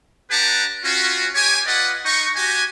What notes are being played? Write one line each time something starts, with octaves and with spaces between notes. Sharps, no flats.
D4 G4 B4 F#5 A5 A#5
C#4 F4 F#4
G4 C#5 G#5
F4 B4 D5 D#5 F#5
D#4 C#6
F#4 G4 G#5